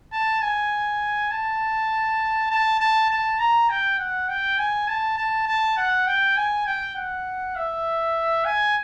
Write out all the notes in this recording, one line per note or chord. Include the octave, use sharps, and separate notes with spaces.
A5
G#5
A5
A5
A5
A5
A#5
G5
F#5
G5
G#5
A5
A5
A5
F#5
G5
G#5
G5
F#5
E5
G#5